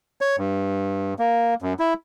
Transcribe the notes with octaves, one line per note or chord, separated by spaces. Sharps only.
C#5
G2
A#3
F#2
E4